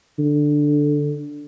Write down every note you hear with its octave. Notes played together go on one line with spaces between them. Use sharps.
D3